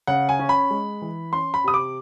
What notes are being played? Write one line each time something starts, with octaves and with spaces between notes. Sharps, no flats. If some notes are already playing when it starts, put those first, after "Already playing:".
C#3 F#5
G#5
C#4
B5
G#3
E3
C#4 C6
B5
C3 D#6
D6